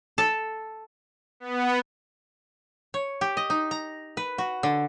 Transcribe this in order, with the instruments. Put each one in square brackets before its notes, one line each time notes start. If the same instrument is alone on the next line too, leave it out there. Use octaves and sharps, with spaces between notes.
[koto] A4
[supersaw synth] B3
[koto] C#5
G4
D#5
D#4
A#5
B4
F#4
D3